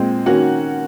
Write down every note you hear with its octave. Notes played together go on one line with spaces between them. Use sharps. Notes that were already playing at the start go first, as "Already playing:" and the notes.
Already playing: A#2 G#3 C4
D#3 A#3 C#4 F#4 F#5